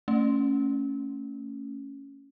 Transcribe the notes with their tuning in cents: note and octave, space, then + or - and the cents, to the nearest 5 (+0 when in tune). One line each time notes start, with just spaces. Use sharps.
A3 +35 C#4 +0